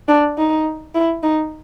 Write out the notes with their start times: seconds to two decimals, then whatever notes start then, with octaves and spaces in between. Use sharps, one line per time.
0.08 D4
0.38 D#4
0.95 E4
1.23 D#4